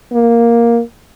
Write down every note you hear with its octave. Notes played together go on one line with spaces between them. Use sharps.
A#3